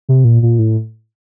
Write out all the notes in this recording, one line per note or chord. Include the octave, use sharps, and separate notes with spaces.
C3
A#2
A#2
A2